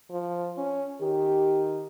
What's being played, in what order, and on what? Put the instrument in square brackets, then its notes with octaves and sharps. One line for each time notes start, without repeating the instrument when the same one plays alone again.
[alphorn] F3
C#4
[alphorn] D#3 [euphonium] G4